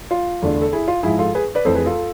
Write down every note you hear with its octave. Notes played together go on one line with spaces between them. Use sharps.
F4
E2 D3 A3 D4
A4
E4 G#4
F4
G#2 F3 G#3 E4 G#4
F4 A4
G#4 B4
B4 D5
F2 E3 A3 A4 C5
G#4 B4
F4 A4